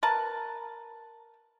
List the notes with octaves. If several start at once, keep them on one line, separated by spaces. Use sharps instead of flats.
A#4 B4 A5